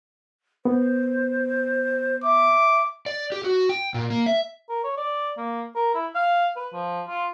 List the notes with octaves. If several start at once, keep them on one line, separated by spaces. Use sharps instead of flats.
B3 C5
E5 D6
D5
G4
F#4
G5
A#2
A#3
E5
A#4
C#5
D5
A#3
A#4
E4
F5
B4
F3
F4